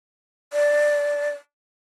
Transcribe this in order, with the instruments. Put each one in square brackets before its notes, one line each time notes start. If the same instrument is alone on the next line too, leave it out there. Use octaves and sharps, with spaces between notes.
[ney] D5